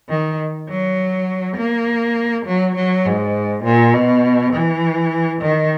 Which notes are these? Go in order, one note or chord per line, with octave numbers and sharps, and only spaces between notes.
D#3
F#3
A#3
F#3
F#3
G#2
A#2
B2
E3
D#3